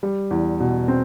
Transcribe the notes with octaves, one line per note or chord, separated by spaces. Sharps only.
G3
E2
B2
C4